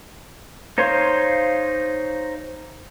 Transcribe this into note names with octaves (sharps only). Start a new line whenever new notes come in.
D#4 C5 C#5 F5 C6